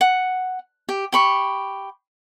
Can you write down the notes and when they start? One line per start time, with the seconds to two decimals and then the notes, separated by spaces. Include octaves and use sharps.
0.01 F#5
0.89 G4
1.12 G4 B5 C#6